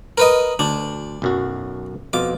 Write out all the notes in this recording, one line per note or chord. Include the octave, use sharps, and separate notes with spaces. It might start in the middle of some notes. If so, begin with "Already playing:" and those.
A#4 B4 D#5
D2 D4
B1 F#2 F#4
F2 B2 F4 D6